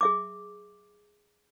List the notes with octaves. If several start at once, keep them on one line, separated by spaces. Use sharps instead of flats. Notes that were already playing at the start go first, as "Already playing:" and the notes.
G#4 E5 D6